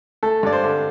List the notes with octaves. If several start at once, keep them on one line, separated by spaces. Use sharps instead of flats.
A3 A4
G2 D5
C5
D3